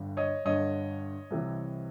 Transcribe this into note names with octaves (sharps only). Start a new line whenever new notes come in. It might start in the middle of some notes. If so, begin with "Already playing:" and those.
Already playing: G1 G2 D3
C#5 D#5
G1 G2 D3 C#5 D#5
C2 C3 E3